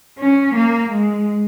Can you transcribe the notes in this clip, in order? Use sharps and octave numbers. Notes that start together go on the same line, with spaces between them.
C#4
A#3
G#3